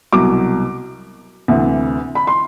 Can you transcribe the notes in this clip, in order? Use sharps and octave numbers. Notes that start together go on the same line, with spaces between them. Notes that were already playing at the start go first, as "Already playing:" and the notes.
C2 B2 F#3 D6
D2 C3 E3
B5
C6